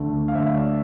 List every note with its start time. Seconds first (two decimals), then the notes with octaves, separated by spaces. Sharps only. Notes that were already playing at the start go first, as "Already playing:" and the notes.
Already playing: D2 D3 A3
0.28 F5
0.35 D2 D3 A3 E5
0.55 D5